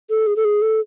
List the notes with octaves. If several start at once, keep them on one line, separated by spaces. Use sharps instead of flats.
A4
G#4
A4
G#4
A4